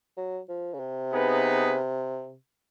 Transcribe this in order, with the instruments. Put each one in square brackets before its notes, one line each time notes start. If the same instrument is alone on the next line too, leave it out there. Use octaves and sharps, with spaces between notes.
[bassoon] F#3
F3
C#3
C3
[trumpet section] B3 D#4 G#4 B4